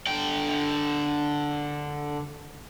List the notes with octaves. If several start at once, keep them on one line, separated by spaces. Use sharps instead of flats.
D3 G5